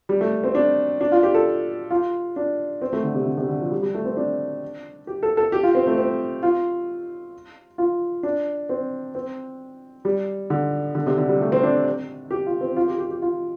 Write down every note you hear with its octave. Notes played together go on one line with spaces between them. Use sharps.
G3
A3
C4
D4
D4
F4
G4
A4
F4
D4
C4
A3
D3
C3
D3
C3
D3
F3
G3
G3
A3
C4
D4
G4
A4
A4
G4
F4
C4
A3
C4
F4
F4
D4
C4
C4
G3
D3
D3
C3
D3
G3
A3
C4
D4
G4
F4
C4
F4
G4
G4
G4
F4